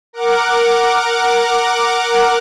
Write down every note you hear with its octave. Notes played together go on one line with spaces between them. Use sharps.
A#4 F#5 D6